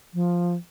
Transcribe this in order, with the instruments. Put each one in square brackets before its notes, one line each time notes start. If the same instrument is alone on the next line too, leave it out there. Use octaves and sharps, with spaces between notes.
[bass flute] F3